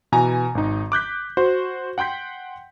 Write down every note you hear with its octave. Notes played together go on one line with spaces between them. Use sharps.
B2 E3 G#5 A#5
G#1 D#4
D6 F#6 G6 B6
F#4 C5
F#5 G5 C6 G6 B6